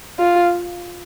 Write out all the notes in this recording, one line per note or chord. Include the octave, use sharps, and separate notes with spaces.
F4